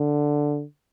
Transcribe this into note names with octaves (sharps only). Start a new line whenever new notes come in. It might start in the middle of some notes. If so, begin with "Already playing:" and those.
Already playing: D3